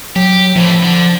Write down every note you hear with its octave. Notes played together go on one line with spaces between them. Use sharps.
F#3 G4
A2 E3 F3
D3